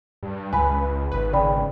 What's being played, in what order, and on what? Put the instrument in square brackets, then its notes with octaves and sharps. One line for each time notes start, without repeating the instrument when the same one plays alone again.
[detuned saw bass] G2
[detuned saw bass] C#2 [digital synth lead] B4 [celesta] G#5 B5
[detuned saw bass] G#1 [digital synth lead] B4
[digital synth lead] C#3 [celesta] D5 G5 B5